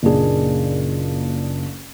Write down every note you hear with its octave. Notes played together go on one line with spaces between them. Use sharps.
F#1 A#2 D4 G#4